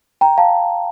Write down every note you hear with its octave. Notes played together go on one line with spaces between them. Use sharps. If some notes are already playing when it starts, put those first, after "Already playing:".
G5 A#5
F5 A5